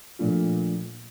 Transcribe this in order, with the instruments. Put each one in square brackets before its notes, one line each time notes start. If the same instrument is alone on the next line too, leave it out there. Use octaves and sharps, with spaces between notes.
[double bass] A#2 [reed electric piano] F3 A3 D4 F4